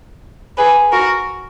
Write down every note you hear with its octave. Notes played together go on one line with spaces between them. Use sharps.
G#4 B4
F#4 A#4